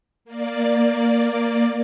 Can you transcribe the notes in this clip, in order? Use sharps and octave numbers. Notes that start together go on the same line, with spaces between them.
A#3 D5